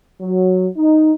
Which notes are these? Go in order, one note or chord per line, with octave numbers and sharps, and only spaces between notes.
F#3
D#4